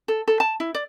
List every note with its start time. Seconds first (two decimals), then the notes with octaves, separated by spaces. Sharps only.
0.08 A4
0.28 A4
0.40 A5
0.60 E4
0.75 D5